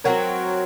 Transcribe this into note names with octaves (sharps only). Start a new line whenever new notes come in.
F#3 C4 F#4 A#4 C#5